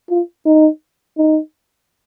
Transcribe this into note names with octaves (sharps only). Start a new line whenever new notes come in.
F4
D#4
D#4